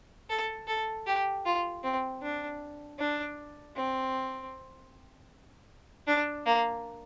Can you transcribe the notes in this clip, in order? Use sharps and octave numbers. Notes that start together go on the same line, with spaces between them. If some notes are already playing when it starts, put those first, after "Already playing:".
A4
A4
G4
F4
C4
D4
D4
C4
D4
A#3